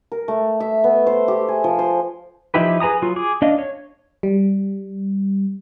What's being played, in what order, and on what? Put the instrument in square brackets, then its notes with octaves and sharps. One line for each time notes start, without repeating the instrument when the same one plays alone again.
[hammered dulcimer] A#4
A3
E5
B3
C5
G4
G#4
F3
C5
[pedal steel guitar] F3 D#4 E4 G4 B4
G#4 B4 G#5 A#5 D#6
F#3 F4
G#4 D6 D#6
D4 D#5 F5
C#5
[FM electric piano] G3